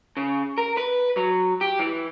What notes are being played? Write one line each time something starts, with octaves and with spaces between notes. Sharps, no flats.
C#3
A#4
B4
F#3
G4
E3